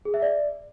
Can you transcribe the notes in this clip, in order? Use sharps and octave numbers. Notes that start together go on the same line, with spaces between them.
G#4
E5
D5